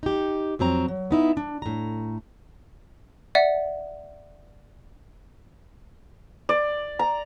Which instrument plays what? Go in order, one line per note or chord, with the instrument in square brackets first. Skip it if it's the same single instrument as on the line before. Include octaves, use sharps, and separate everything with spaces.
[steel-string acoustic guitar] D#4 G4
F2 F#3 C4 A#5
F#3
B3 D#4 E4
D4
A2 A#5
[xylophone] D5 E5 F#5
[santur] D5
A#5